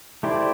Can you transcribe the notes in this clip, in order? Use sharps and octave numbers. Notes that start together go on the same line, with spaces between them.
A3 E4 G4 C5 D5